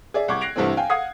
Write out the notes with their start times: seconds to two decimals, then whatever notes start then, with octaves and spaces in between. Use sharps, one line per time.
0.14 G#4 D5 E5
0.28 C2 C#6 D6 G#6
0.41 F#6 A#6 C7 D7 F7
0.56 C2 G2 E3 A3 C4
0.77 F5 G5 G#5
0.90 F5 F#5 D#6 G#6 C7